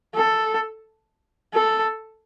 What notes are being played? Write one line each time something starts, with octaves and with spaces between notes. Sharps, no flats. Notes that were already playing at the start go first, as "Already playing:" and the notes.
A4
A4